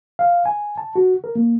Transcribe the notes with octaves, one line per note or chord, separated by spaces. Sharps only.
F5
G#5
A5
F#4
A#4
A#3